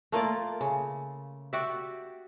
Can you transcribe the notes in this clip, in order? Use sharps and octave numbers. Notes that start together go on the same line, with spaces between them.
A3 A#3 F4 D5
C#3
F#4 G4 D5 E5